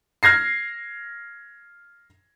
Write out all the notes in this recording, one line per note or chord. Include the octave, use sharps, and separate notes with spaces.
F6 G#6 A#6 C7